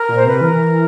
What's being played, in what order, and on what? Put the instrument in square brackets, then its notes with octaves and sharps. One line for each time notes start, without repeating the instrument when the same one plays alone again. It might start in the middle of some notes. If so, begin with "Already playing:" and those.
Already playing: [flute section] A#4
[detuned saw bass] A#2
[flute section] C5
[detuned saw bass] C3 [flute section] B4
[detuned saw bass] E3 [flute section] A#4